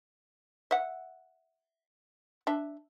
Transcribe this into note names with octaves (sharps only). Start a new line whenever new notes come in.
E5 F#5
D4 E5